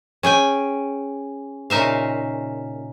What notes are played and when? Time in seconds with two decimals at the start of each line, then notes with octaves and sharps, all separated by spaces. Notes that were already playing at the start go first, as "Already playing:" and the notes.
0.23 C#4 G#4 G5 G#5
1.70 A#2 C#3 D#4 E5 F5